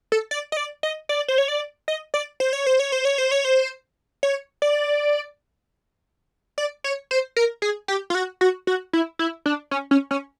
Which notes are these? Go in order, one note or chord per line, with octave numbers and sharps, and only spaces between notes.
A4
D5
D#5
D5
D#5
D5
C5
C#5
D5
D#5
D5
C5
C#5
C5
C#5
C5
C#5
C5
C#5
C5
C#5
D5
D5
C#5
C5
A#4
G#4
G4
F4
F#4
F#4
F#4
E4
E4
D4
C#4
C#4
C#4